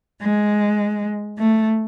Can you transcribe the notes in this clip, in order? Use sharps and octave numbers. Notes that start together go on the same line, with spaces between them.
G#3
A3